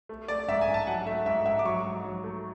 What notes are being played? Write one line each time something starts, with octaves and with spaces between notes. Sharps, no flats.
A3
A3 D5
G#2 E5
G#5
G#2
A5
F#3 F#5
A3 E5
G#2 E5
G#2 E5
D6
F#3 C#6
G#2
F#3
A3